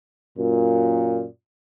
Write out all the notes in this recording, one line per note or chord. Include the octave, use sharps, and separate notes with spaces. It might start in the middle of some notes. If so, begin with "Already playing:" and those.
F#2 A#2